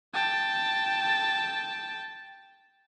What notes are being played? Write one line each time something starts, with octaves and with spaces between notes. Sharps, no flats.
G5 A5